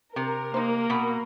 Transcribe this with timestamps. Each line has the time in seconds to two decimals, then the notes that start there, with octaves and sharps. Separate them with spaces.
0.16 C3 A#4
0.54 A#3 D#4 C5
0.90 B2 B5